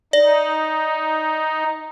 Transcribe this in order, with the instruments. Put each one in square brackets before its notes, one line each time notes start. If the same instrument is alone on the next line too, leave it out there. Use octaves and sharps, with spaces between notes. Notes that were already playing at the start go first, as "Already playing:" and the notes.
[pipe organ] D#4 [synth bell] D5